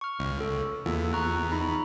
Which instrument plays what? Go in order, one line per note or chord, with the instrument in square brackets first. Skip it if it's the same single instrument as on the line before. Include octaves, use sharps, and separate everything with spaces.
[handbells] C#6 F6
[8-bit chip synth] C#2
[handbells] A4
[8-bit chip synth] E2 [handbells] A#3 F4 A4
[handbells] A#5 C#6 F#6
D#4 A#5 B5